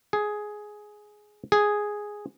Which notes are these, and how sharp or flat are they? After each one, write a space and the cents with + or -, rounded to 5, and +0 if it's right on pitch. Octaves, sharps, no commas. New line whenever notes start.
G#4 +10
G#4 +0